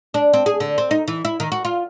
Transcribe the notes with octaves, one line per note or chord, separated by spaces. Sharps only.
D4
C4
G#4
D3
C4
D#4
E3
E4
D#3
F#4
F4